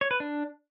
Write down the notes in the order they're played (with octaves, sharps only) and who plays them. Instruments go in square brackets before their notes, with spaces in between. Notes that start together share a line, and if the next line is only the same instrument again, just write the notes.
[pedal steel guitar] C#5
B4
D4